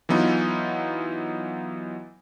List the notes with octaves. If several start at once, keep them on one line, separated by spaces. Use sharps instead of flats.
E3 F#3 B3 D#4 F4